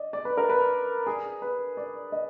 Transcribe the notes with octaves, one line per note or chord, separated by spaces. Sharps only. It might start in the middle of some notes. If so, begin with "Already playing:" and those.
Already playing: D5 D#5
D5
B4
A#4
B4
G#4
B4
D5
D#5